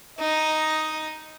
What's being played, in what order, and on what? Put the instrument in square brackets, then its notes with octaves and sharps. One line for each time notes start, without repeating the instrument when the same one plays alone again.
[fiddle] D#4 [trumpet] D#5